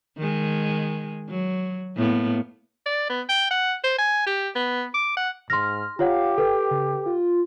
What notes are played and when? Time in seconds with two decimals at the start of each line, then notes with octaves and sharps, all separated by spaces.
0.18 D#3 G#3
1.29 F#3
1.97 A2 A#3 B3
2.86 D5
3.09 B3
3.29 G5
3.51 F#5
3.84 C5
3.98 G#5
4.26 G4
4.55 B3
4.94 D6
5.17 F#5
5.50 G#2 C6 F6 A#6
5.99 F4 G4 C#5 F5 F#5
6.38 A4 B4 G5
6.71 C#3
7.06 F4